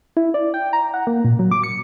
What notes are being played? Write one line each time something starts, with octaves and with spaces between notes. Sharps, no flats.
E4
D5
G5
A#5
F#5
A#3
A#2
F#3
D6
C#7